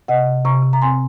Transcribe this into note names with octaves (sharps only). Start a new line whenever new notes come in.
C3 D#5 F#5
C3
C3 A#5 C#6
C3
A#5
C4 G#5 C6